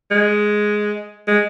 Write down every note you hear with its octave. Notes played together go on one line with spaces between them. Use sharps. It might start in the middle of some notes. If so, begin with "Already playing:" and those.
G#3
G#3